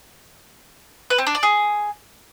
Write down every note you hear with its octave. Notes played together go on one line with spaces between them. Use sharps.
B4
C4
D4
D5
G#4